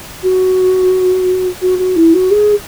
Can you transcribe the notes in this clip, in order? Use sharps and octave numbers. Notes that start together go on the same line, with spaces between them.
F#4
F#4
F#4
E4
F#4
G#4